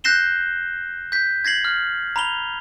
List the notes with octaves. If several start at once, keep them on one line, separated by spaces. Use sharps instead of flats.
F#6 G6 A#6 C7 E7 G7
G6 B6
G#6 A#6 C7 F#7
F6
A#5 B5 F7 G7